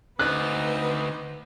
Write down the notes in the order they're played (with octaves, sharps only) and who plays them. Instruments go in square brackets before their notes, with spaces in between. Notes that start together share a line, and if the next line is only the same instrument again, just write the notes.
[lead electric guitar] D2 [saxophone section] C4 D#4 [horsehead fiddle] B4 [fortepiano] F#6